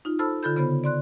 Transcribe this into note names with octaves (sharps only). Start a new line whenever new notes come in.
D#4 F4
A4 C5 A5 B5 E6 F6
D3 F4 A4 B5 G6
C#3 B3 C5 B5
D5 C6 F#6